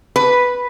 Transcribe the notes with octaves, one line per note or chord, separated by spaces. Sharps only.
B4